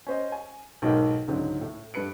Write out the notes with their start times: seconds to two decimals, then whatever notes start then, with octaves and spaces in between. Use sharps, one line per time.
0.07 C#4 C5 D#5
0.32 G#5
0.82 B1 G#2 D#4 A#4 G5
1.28 C#2 G#2 D3 F#3
1.61 A2
1.94 G2 A4 B4 C#7 D7